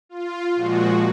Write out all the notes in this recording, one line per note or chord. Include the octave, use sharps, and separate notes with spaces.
F4
A#2 F3 G#3 F#4